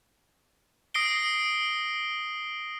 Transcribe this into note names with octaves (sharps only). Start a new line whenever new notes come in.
D#6 A#6 C7 D7 G7